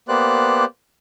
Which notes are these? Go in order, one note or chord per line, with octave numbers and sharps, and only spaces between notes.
A#3 B3 G4 C5 D5 F#6